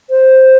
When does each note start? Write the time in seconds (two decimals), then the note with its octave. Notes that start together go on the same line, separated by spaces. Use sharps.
0.10 C5